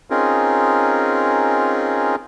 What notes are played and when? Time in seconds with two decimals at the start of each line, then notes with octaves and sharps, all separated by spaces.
0.10 C4 C#4 D#4 F4 G#4 A#4